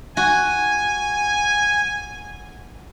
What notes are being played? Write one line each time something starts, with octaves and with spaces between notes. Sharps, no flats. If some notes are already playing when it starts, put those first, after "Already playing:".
F#4 G#5